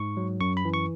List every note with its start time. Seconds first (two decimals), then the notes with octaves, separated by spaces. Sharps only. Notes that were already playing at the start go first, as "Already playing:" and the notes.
Already playing: G#2 C#6
0.17 F#3
0.40 F#2 C#6
0.57 B5
0.65 E3
0.74 C#6